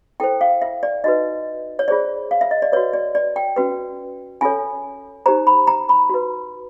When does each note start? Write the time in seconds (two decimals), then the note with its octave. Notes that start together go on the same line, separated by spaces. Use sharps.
0.20 E4 A4 C5 G5
0.41 F5
0.62 E5
0.83 D5
1.04 D#4 F#4 B4 D#5
1.79 C#5
1.88 F4 G#4 C5 D5
2.31 F5
2.41 E5
2.51 D#5
2.62 D5
2.72 B4 C#5
2.76 F#4
2.93 D5
3.15 D5
3.36 G5
3.56 C#4 F#4 B4
4.41 C#4 F4 A4 C#5 G#5
5.26 D#4 G4 C5 A#5
5.47 B5
5.67 A#5
5.89 B5
6.10 F#4 B4